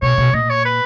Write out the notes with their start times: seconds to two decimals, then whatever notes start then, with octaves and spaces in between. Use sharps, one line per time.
0.02 B2 C#5
0.18 B2
0.33 A#2 D#5
0.50 C#5
0.65 B4